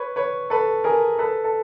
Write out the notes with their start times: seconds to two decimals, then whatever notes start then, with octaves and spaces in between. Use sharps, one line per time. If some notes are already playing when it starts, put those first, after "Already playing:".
Already playing: B4 C#5
0.16 B4 C#5
0.50 A4 B4
0.84 G#4 A#4
1.19 A4 B4
1.44 A4